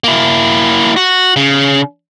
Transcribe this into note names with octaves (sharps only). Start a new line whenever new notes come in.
A#3 E4
F#4
C#3